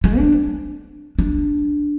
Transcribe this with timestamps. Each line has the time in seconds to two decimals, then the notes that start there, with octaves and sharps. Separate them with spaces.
0.04 G#3
0.18 D4
1.19 D4